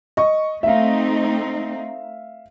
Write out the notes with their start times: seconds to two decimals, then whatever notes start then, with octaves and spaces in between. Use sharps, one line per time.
0.17 D#5 C#6
0.63 A3 C4 D#4 E5 F5